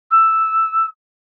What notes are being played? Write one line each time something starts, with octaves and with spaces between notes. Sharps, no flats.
E6